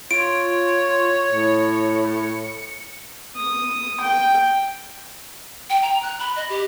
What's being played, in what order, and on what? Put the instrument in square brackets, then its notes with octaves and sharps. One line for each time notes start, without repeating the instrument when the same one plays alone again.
[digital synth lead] F4 [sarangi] C#5 [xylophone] D7
[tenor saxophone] A2 [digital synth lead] C#7
[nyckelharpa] D#6
G5
[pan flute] G5
A#5
F#6
B5
D#5
G4